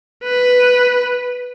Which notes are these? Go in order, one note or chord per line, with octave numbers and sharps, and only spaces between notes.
B4